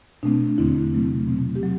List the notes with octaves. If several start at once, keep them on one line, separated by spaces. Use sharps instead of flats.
B2 A3 C4 D4
E2 D3 A3 C4 E4
C3 F#3 A3 C4
B2 A3 C4
G4
F#3